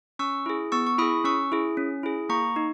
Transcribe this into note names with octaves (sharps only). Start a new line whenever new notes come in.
C#4 C#6 E6
E4 G#4
B3 C#6 E6
C#6
E4 G#4 B5 D#6
C#4 C#6 E6
E4 G#4
C#4
E4 G#4
A#3 A#5 C#6
D#4